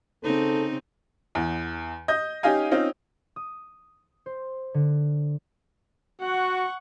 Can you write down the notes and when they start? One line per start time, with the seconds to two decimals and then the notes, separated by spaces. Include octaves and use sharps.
0.23 C#3 C4 D#4 A4
1.35 E2
2.08 D#5 G6
2.43 C#4 D#4 G4 D#5 F5 G#5
2.71 C4 C#4 D#4 F4
3.36 D#6
4.26 C5
4.74 D3
6.22 F#4 F#5 C#6